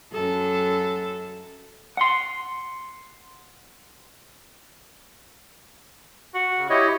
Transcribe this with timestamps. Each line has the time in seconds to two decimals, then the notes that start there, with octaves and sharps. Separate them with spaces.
0.13 F#2 A4
1.97 F#5 C6
6.35 F#4
6.57 C#3
6.70 E4 G4 C#5 D#5